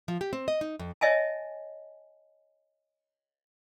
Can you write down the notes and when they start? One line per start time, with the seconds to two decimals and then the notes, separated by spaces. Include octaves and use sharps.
0.08 F3
0.21 G4
0.33 C4
0.48 D#5
0.61 D#4
0.79 F2
1.01 C#5 D#5 E5 G#5 A5